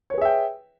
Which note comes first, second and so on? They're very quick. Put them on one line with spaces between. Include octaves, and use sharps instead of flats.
C#5 B4 G#4 E5 G5